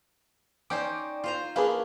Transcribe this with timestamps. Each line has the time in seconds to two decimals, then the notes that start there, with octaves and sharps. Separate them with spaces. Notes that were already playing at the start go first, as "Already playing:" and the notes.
0.70 C#4 D#4 C5 D5 G5 D6
1.24 F4 C5 A#5
1.56 A#3 C#4 D4 G#4 B4 F5